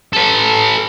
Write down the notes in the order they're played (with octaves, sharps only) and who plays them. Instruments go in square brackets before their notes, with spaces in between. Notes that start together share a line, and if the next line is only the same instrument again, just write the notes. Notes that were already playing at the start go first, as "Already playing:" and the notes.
[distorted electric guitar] A4 B4